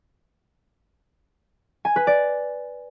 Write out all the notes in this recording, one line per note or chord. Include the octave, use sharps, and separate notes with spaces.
G#5
B4
D5